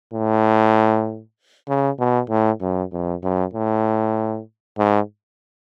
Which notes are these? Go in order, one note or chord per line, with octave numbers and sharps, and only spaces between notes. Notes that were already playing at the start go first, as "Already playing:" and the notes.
A2
C#3
B2
A2
F#2
F2
F#2
A2
G#2